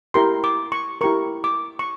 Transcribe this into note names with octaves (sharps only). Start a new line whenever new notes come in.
E4 G4 A#4 C6
D6
C#6
E4 G4 A#4 C#6
D6
C#6